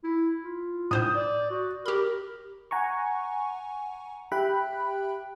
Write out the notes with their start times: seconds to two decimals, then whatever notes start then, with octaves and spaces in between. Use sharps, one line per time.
0.04 E4
0.44 F4
0.91 A2 C5 D#6 G6
1.15 D5
1.50 F#4
1.86 G4 A#4 B5
2.71 F#5 G#5 A#5 C#6
4.32 G4 E5 G5 B5 F#6